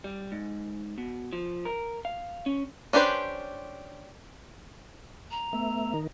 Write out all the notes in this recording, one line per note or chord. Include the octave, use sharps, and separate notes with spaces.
G3
G#2
B2
F3
A#4
F5
C#4
C#4 D4 G4 B4 C5
A#5
A3 B3 E5
D#3 D#4 A#4